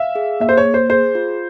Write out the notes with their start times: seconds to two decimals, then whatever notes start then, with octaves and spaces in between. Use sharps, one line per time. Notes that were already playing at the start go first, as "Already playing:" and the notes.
Already playing: E5 F5
0.15 G#4
0.40 A#3 E5
0.49 C5
0.57 C#5
0.65 A#3
0.74 C5
0.90 G#4 C5
1.15 F4